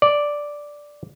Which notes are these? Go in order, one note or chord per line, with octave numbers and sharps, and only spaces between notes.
D5